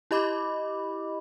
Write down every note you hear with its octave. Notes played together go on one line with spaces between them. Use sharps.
E4 G4 D#5 B5 D6